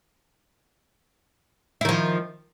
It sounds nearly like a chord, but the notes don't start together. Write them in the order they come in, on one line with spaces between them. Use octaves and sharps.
E4 D#3 F3